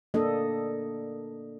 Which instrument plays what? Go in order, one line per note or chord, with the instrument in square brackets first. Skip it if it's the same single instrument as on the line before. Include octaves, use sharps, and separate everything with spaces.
[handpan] A#3 D4 A4 D#5